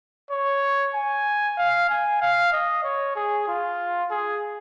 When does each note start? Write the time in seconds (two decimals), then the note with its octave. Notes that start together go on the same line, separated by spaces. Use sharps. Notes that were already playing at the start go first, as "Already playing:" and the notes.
0.31 C#5
0.94 G#5
1.58 F5
1.89 G#5
2.21 F5
2.53 D#5
2.84 C#5
3.16 G#4
3.48 F4
4.11 G#4